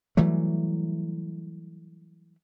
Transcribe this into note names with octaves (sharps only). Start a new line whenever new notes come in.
E3 F#3 G3 A3